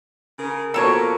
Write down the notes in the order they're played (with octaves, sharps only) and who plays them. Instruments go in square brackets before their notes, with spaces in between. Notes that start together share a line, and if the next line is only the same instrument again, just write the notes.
[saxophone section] C#3 G#4 A#4
[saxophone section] B2 F3 A#3 [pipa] A4 A#4 C#5